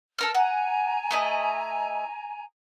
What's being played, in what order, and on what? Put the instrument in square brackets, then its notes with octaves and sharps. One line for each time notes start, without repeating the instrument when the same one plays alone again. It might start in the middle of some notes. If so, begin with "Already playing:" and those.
[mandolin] A4 A#4 F6
[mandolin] F#5 [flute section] G#5 A#5
[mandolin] A3 E4 D#5